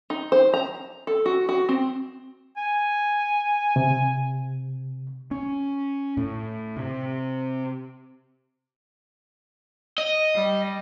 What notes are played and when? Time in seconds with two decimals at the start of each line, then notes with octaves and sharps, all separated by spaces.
0.10 D#4
0.32 C5
0.54 A#5
1.07 A4
1.26 F#4
1.49 F#4
1.69 C4
2.57 G#5
3.76 C3
5.31 C#4
6.17 A2
6.76 C3
9.98 D#5
10.35 G3